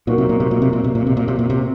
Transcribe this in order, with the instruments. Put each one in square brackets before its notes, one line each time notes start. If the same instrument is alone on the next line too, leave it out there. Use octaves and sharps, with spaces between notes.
[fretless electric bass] A#2 [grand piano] F#3 A#3 D#4 F#4 A#4
[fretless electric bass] C3
A#2
C3
A#2
C3
A#2
C3
A#2
C3
A#2
C3
A#2
C3